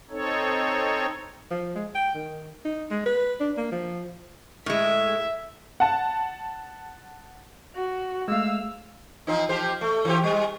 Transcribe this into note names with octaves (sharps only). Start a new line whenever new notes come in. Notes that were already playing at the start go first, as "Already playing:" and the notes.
C4 D#4 A4 C#5
F3
G#3
G5
D#3
D#4
G#3
B4
D4
A#3
F3
A2 G#3 E5
F#5 A5
F#4
G#3 A3 F5 E6
F3 C4 D#4
F3 G4 C5
A3
E3 C4 G4
G3 G#3